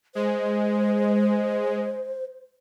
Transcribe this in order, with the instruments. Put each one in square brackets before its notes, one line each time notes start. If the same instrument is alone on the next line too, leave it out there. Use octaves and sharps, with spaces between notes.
[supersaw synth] G#3 [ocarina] C5